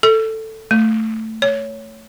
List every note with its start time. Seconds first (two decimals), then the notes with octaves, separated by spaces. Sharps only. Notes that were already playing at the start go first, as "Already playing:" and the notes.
0.03 A4
0.71 A3
1.42 C#5